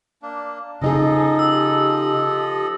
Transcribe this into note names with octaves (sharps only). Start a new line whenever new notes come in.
A#3 D4
C#3 F3 D#4 G#4 A4 D#5
G4 E6